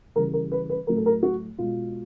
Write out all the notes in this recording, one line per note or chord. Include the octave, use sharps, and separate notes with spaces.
C#3 E3 G3 A#4
A#4
B4
B4
A2 F#3 A3 A#4
A4
A#4
F#4
B2 G#3 F4